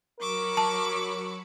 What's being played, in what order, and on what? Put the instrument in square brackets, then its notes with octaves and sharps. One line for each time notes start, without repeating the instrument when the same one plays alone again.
[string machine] F#3 B5 C#7 [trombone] A#4 [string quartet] C#6 D6 E6
[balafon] A5